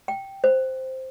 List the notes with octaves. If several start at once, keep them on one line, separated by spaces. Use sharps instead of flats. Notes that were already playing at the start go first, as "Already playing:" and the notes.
G5
C5